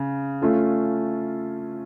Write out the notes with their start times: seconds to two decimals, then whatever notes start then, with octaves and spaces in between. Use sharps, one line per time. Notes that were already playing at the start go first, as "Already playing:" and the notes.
Already playing: C#3
0.42 A3 C#4 F4 A4